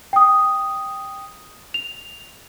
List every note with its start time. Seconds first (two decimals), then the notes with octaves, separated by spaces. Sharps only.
0.13 G5 D#6
1.74 F7